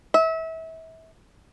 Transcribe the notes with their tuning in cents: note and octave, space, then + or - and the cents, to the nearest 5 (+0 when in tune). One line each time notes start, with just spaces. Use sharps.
E5 -30